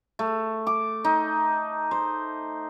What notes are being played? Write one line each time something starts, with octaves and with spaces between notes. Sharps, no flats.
A3
D6
D#4
C5